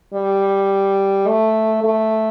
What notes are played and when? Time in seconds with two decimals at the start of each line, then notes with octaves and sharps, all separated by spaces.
0.14 G3
1.28 A3
1.84 A3